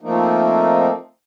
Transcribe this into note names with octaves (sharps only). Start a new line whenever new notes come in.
F3 A3 A#3 C4 D#4